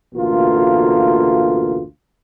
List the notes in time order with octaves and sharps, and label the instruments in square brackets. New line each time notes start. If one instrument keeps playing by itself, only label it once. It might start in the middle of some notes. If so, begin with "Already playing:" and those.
[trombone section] A1 D2 B2 A#3 F4